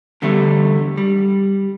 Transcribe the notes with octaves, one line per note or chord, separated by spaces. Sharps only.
E2 D3 G3 A3
G3